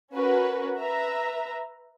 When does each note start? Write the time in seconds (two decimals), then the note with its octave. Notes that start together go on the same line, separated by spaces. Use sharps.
0.13 C#4 F#4 A#4 B4
0.77 B4 E5 A#5